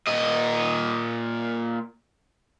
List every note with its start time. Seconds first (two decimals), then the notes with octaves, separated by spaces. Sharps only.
0.07 A#2 D#5